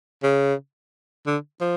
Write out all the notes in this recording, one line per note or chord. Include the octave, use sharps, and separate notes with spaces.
C#3
D3
F3